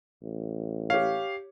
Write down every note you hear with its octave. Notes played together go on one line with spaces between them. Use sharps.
A1
G4 C#5 F5